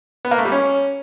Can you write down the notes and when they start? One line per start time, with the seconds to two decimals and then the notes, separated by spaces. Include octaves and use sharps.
0.25 B3
0.31 A#3
0.38 A3
0.45 G3
0.52 C#4